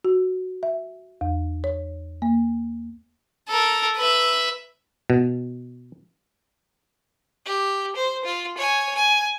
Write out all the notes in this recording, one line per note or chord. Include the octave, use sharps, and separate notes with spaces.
F#4
E5
E2
C#5
A#3
A4 A#4
B4 E5
B2
G4
C5
F4
C#5 G#5
G#5